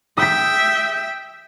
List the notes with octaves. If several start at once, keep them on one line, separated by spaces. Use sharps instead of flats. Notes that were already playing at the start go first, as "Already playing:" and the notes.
E5 G5 D#6 B6